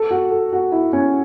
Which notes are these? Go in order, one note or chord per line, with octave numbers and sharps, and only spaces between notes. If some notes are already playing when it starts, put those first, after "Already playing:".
Already playing: A4
F#4
A4
F#4
E4
C#4